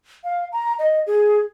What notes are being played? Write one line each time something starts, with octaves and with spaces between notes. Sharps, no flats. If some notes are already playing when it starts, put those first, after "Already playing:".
F5
A#5
D#5
G#4